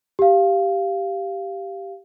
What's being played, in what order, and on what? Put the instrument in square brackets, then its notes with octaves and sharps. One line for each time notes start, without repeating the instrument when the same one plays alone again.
[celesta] G4 F5